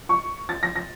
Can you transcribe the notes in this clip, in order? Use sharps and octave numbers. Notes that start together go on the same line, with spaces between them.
C#6
A6
A#6
A#6